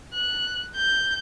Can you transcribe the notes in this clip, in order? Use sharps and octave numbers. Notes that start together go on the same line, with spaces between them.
F#6
G6